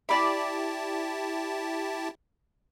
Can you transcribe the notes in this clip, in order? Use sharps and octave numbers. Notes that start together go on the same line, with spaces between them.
E4 G4 D5 A5 B5